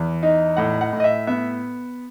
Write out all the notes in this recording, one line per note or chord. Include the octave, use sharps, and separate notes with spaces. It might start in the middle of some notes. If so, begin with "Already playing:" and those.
Already playing: E2
D#4
A2 F#5
F#5
A2
D#5
E5
B3 E5